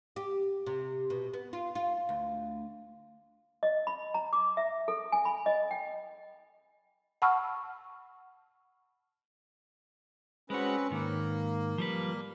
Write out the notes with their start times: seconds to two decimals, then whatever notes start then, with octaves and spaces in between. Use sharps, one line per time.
0.16 G4
0.66 C3
1.10 B2
1.34 B3
1.53 F4
1.75 F4
2.09 D2
3.63 D#5
3.87 B5
4.14 A#5
4.33 D6
4.57 E5
4.88 A4
5.12 G#5
5.25 B5
5.46 D#5
5.71 G5
7.22 F#5 A5 B5 C#6 E6 F6
10.50 G#3 C4 C#4 F#4 B4
10.90 G#2 D#3 A#3
11.78 F3 G3 B4